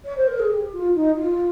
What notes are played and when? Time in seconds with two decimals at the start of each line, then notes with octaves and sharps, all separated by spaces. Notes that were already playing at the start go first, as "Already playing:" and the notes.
0.04 C#5
0.16 C5
0.27 A#4
0.39 G#4
0.50 G4
0.72 F4
0.94 D#4
1.16 F4